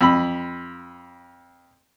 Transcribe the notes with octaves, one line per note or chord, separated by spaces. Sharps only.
F2 B5